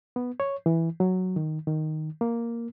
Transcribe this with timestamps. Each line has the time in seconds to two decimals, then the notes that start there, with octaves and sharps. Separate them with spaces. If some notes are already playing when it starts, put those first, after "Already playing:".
0.16 B3
0.40 C#5
0.66 E3
1.00 F#3
1.36 D#3
1.67 D#3
2.21 A#3